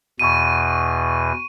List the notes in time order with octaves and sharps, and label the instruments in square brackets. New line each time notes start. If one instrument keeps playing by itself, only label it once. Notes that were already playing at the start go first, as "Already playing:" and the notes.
[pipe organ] E2 B2 [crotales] C#6 D#7